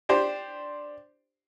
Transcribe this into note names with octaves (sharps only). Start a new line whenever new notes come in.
D4 G4 C5